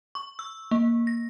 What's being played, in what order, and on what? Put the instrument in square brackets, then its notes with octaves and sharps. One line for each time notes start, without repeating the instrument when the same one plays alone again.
[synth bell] C#6
E6
A#3
A#6